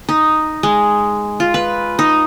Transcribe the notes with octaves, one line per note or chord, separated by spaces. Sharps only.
D#4
G#3
F4
B4
D#4